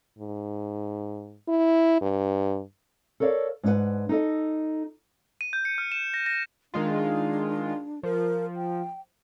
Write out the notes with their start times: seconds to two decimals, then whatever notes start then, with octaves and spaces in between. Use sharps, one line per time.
0.19 G#2
1.49 E4
2.01 G2
3.20 A4 A#4 C#5 D5 F5
3.63 G#2 D4 D#4 B4 F#5
4.09 D#4 A4 D#5
5.41 D#7
5.53 G6
5.65 C#7
5.78 F6
5.92 E7
6.14 A#6
6.26 A#6
6.74 D#3 G#3 D4 F4
8.03 F3 A#4
8.56 G5